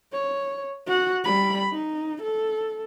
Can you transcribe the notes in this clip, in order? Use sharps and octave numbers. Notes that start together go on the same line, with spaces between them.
C#5
F#4 F#5
G3 B5
D#4
A4